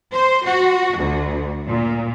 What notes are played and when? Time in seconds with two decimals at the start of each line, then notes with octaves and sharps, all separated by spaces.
0.12 C5
0.45 F#4
0.97 D2
1.67 A#2